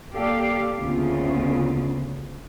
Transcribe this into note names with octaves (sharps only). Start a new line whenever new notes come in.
A#3 G4 A4 D5 F5
D2 C#3 A#3 B3 F4